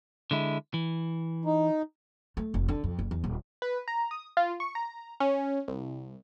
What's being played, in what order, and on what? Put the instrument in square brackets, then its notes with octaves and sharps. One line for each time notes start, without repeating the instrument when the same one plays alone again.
[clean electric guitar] D3 G#3 E4
E3
[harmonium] D#4
[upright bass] A3
F1
D3
F2
F#1
E2
D#1
[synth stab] B4
A#5
D#6
F4
C#6
A#5
C#4
C2